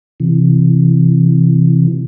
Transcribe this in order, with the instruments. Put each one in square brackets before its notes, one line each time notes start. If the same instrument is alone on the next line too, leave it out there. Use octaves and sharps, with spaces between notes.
[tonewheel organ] C3 E3